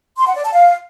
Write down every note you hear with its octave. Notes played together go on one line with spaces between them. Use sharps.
C6
F#5
D5
A5
F5